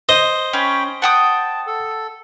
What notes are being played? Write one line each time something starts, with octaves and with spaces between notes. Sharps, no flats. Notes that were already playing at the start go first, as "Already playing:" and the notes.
C5 D#5
C#4 G5 B5
F#5 G5 A5 D#6
A4